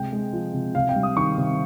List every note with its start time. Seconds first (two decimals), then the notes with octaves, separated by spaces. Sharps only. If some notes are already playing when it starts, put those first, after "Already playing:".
Already playing: C3 G#3 G5
0.13 G#3
0.33 F3
0.54 C3
0.75 C3 F5
0.89 G5
0.96 G3
1.03 D#6
1.16 D#3 C#6
1.38 C3